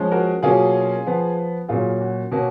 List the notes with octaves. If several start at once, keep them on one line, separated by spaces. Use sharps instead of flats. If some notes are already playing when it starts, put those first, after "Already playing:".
Already playing: F3 G#3 C#4
F#4 A#4
B2 F#3 A#3 C#4 F4 G#4
F3 B3
A#2 F#3 C#4 F4 G#4
F#4
B2 A#3 C#4 F#4